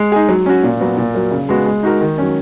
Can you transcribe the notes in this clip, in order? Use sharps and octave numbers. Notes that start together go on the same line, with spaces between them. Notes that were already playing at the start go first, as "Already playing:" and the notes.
Already playing: G#3
D#4 G#4
F#3
C#4 F#4
A#2
F#3 B3 F#4
A#2
F#3 A#3
C#3
G#3 B3 F#4
G#3
D#4 F#4 A#4
D#3
F#3 C#4